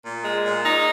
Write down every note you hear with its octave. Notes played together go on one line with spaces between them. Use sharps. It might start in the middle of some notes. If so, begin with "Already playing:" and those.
A#2
G#3
A#2
D#4